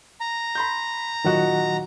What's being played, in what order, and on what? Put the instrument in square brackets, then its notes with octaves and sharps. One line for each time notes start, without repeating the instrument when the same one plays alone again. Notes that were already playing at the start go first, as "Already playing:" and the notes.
[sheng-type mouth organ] A#5
[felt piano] B5 C6 G6
[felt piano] A#2 D#4 F#4 [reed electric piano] D#3 F#3 F#5